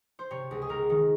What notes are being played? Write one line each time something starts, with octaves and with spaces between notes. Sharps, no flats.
C5
C3 C#5
C#2
G#4
C#2 A#4
D#3